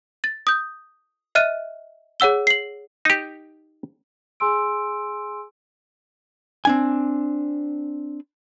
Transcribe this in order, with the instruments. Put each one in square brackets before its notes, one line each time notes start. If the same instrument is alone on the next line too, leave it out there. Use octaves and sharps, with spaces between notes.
[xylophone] A6
D#6 G6
D#5 E5 F6 F#6 D#7
G#4 C#5 F#5 E6 G7
C7 F#7
[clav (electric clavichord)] D#4 G4
[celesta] G#4 G#5 C6 E6 D7
[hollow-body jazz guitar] C4 D4 G#5